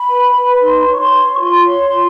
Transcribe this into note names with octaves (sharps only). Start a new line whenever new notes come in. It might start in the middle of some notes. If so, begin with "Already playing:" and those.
Already playing: B5
B4
B4
B5
D#4 C6
C#5
C#6
C6
C#5
C#6
F4 C6
C#5
F4